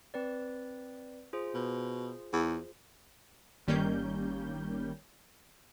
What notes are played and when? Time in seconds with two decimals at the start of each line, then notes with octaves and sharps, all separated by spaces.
0.14 C4 B4 D5
1.33 F4 G#4 C5
1.54 B2
2.33 E2
3.67 G1 D#3 G3 A#3 C#4 G6